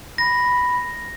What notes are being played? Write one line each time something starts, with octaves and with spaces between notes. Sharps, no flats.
B5 A#6